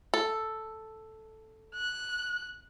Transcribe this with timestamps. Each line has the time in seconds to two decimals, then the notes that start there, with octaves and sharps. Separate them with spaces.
0.14 A4
1.75 F#6